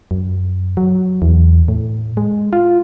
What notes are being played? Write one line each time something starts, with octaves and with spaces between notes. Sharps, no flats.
F#2
F#3
E2
A2
G#3
F4